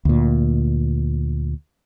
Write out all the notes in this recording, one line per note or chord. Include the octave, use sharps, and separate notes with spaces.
D2 A#2